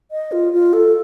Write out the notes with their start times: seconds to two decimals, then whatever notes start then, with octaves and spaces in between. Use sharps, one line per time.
0.11 D#5
0.32 F4
0.53 F4
0.73 A4